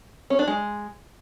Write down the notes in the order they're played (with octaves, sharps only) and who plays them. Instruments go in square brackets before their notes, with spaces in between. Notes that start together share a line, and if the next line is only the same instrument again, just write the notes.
[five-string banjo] C#4
D4
G#3